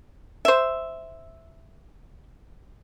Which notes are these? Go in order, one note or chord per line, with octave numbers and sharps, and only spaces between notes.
C5 E5